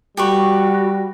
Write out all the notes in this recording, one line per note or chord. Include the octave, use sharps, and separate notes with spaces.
G3 F#4 G4 B4 C#6